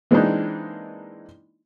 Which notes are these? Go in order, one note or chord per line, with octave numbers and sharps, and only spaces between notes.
E3 G#3 A#3 C4 D4 D#4